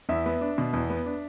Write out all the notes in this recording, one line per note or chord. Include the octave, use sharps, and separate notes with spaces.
E2 E5
B3
D4
B2
E2
B3
D4